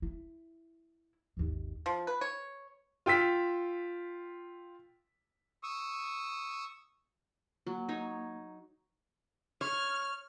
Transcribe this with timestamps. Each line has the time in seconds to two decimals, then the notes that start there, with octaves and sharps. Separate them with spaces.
0.02 E4
1.37 G#1 D#2
1.86 F3
2.07 B4
2.21 C#5
3.06 F4 G5 E6 B6
5.63 C#6 D#6 E6
7.67 F#3 A#3
7.89 D#4 C#5
9.61 C#5 F6